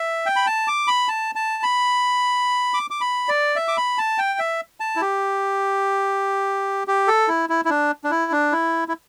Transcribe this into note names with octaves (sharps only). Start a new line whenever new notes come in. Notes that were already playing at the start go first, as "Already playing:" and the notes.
Already playing: E5
G5
B5
A5
D6
B5
A5
A5
B5
D6
D6
B5
D5
E5
D6
B5
A5
G5
E5
A5
E4
G4
G4
A4
E4
E4
E4
D4
D4
E4
D4
E4
E4